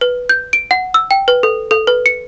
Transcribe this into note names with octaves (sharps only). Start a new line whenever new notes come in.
B4
G6
D7
F#5
E6
G5
B4
A4
A4
B4
C#7